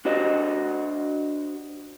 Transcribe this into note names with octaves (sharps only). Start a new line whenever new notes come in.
D4 F#4 C5 D#5